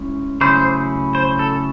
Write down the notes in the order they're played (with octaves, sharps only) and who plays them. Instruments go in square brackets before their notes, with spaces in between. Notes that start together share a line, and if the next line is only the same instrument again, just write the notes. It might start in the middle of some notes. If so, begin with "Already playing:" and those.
Already playing: [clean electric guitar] G#3 C#4 E4
[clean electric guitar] C#3 F#3 A3 C#4 E4 [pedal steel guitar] C5
[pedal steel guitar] C5
A4